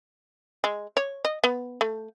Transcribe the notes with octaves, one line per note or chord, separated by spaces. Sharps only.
G#3
C#5
D#5
B3
A3